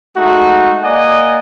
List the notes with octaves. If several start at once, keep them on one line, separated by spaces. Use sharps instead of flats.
G#3 A3 D#4 F#4
A#3 D5 D#5 F#5 G#5